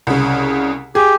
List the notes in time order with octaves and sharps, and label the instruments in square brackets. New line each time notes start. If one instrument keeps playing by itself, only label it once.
[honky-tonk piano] C2 C#3
[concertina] G4 [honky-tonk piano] G#4